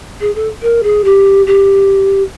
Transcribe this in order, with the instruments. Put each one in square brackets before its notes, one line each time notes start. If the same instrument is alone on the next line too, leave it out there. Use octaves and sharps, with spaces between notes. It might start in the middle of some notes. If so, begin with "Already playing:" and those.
[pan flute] G#4
A4
A#4
G#4
G4
G4